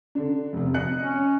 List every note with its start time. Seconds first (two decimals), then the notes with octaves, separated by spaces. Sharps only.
0.15 D3 D4
0.53 F1 C3
0.74 D#5 F#6 C#7
0.99 C#4